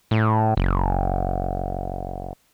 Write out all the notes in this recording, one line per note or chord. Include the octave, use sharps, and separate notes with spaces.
A2
F#1